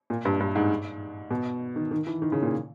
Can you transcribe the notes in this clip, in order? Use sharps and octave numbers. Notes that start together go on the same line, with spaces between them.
A#2
G2
G2
G#2
B2
D#3
D#3
E3
D#3
C#3
A#2